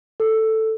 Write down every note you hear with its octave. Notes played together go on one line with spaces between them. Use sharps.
A4